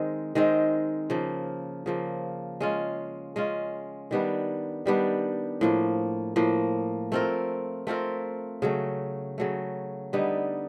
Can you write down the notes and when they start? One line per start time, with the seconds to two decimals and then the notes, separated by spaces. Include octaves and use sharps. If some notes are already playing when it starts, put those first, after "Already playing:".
Already playing: D#3 G#3 C4
0.35 D#3 G#3 C4
1.10 C#3 F3 A#3
1.86 C#3 F3 A#3
2.60 G#3 C#4 F4
3.36 G#3 C#4 F4
4.11 D#3 G3 B3 D4
4.86 D#3 G3 B3 D4
5.61 A2 F3 A#3
6.36 A2 F3 A#3
7.12 A3 C4 F4 A#4
7.87 A3 C4 F4 A#4
8.62 C#3 F#3 A3
9.38 C#3 F#3 A3
10.13 D3 G3 B3 D#4